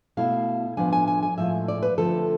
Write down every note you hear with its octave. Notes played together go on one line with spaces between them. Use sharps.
B2 A3 E4 F5
A2 F3 B3 D4 G#5
G#5
G#5
G#5
A2 F3 G#3 E5
D5
B4
D3 F3 A3 C4 A4